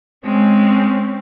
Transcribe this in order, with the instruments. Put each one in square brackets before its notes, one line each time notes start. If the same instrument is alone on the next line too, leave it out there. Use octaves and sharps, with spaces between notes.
[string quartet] G#3 [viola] C4 C#4